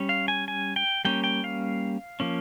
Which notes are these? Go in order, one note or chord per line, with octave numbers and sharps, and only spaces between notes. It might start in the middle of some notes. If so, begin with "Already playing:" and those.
Already playing: G3 C#4
F5
G#5
G#5
G5
G3 A#3 C#4 G5
G5
F5
F3 A#3 C#4